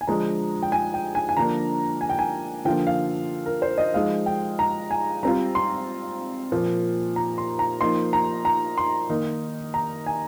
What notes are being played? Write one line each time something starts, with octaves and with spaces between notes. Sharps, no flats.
G#5
D3 F3 G#3 D4 A#5
G5
G#5
G5
G#5
G#5
D3 F3 A#3 D4 A#5
G#5
G5
G#5
D3 F3 A#3 F4 G5
F5
A#4
C5
D#5
F3 G#3 D#4 F5
G5
A#5
G#5
G3 C4 F4 A#5
C6
A#2 F3 A#3
A#5
C6
A#5
F3 A#3 D#4 C6
A#5
A#5
C6
D#3 A#3 D#4
A#5
G#5